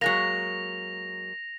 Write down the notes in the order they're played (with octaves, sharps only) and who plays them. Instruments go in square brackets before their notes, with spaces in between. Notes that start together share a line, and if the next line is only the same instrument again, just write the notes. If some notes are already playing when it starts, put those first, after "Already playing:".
[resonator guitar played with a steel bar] F#3 G#3 A#3 [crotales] A#6 F7